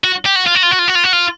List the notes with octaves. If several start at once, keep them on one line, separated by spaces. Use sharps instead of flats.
F#4
G4
F#4
F4
F#4
F4
F#4
F4
F#4
F4
F#4
F4